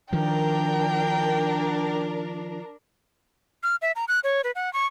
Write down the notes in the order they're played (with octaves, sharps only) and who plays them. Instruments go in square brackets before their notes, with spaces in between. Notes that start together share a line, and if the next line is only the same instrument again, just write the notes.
[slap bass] D#3 F3 [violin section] D4 A#4 [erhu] G5
[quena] F6
E5
A#5
F#6
C#5
B4
F#5
C#6